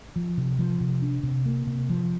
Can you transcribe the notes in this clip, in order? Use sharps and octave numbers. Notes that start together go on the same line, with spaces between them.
F3
C3
F3
C3
D4
C3
A#3
C3
F3